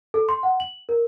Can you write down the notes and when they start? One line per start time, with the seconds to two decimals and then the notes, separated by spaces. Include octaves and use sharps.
0.14 A4
0.29 C6
0.43 F#5
0.60 F#7
0.89 A#4